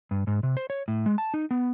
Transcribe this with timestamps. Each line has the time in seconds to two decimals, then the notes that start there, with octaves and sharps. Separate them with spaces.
0.11 G2
0.27 G#2
0.43 C3
0.57 C5
0.70 C#5
0.88 A2
1.06 G#3
1.18 A5
1.34 D#4
1.51 B3